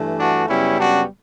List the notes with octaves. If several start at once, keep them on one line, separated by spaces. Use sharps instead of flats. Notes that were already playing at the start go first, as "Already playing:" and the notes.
Already playing: G2 E3 A3
D4 F#4
F#2 C#3 G3 B3 C#4 E4
D4 F#4